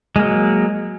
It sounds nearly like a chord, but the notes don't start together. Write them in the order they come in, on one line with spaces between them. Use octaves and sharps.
G#3 A#3 F#3